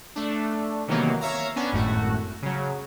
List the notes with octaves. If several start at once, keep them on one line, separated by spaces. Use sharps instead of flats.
A3 D4
C3 D#3 E3 F#3 A#3 B3
C#5 E5 F5 A#5
B3 C#4 D4
G#1 F#2 A2 A3 F#4
C#3 F#3